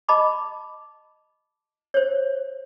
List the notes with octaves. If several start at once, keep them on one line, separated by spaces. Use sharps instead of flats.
D#5 A5 B5 D6
C5 C#5